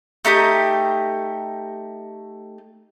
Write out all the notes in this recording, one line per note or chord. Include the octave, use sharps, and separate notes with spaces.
A3 D#4 G4 D#6